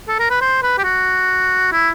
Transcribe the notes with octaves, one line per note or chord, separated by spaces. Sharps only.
A4
A#4
B4
C5
B4
G4
F#4
E4